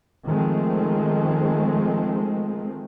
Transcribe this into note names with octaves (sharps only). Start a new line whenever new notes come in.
D#3 F3 G#3 A3 C4